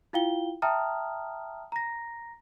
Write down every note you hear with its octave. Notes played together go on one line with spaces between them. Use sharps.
E4 F4 F5 G5 G7
E5 G5 A5 A#5 D#6 F6
A#5 A#6